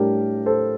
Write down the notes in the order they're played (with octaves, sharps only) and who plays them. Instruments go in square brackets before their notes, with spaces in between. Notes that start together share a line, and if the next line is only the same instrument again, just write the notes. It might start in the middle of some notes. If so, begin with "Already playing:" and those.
Already playing: [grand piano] A2 G3 D4 G4 A#4
A4 C5